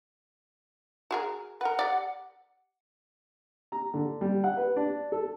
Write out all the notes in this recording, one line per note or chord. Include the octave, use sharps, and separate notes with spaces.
F#4 G#4 A#4
A#4 B4 F#5
G4 D5
A#5
D3
G3
F#5
B4
D4
A4